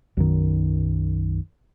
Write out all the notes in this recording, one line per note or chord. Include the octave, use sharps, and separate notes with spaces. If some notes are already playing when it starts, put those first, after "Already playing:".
B1 F#2 D#3